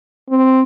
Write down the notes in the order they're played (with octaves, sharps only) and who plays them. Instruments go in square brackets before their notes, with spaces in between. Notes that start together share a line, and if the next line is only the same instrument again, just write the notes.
[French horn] C4